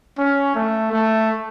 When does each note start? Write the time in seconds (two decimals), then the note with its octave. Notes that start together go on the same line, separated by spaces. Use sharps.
0.18 C#4
0.54 A3
0.92 A3